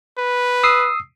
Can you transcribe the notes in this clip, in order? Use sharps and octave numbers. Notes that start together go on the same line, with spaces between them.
B4
D#6 E6 C7